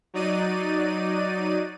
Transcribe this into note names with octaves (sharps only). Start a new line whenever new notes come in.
F#3 D#4 D5 D#7